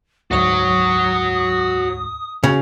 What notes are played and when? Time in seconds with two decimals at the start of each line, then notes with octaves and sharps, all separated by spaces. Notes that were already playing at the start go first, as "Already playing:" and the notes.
0.31 D2 G#2 F#4 C#5 C#6 D#6
2.44 C#3 F#4